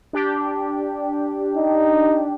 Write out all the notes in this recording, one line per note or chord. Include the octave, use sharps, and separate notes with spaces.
D4 G4
D#4